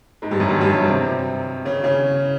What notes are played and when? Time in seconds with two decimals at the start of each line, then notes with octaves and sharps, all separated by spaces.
0.22 G#2 G#3
0.31 G2 G3
0.40 F#2 F#3
0.49 G2 G3
0.61 G2 G3
0.73 F#2 F#3
0.85 C3 C4
1.65 C#3 C#4
1.84 C#3 C#4